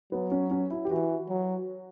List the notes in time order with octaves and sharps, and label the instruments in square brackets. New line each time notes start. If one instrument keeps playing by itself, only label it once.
[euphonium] F#3 [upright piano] B3
[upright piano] C#4
C#4
E4
G4
[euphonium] E3 [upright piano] F#4
[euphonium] F#3